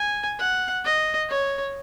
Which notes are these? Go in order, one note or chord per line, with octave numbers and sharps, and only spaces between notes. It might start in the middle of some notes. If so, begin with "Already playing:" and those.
Already playing: G#5
F#5
D#5
C#5